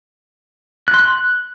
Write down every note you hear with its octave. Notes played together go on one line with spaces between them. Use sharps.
F#6
C6
F#6